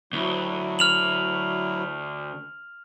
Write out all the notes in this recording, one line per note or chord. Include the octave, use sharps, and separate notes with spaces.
D2 F#3 E4
F6 F7 F#7